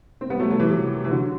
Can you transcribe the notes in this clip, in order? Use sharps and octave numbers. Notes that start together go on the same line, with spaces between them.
C4
G3 B3
F#3 A3
F#3 A3
E3 G3
C3 E3
E3
D3 F#3